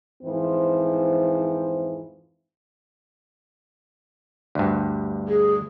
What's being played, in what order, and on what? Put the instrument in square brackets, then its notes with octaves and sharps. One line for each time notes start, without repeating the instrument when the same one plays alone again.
[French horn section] F2 G#2 E3 F3 C4
[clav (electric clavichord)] D2 G2
[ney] G#4